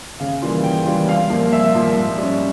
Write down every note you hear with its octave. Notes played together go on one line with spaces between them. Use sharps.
C#3 F5
E3 G3 A#3 F4
C#3 G5
E3 G3 A#3 F4
C2 F5
A#2 F3 A#3
C2 E5
A#2 F3 A#3
G#2
G3 C#4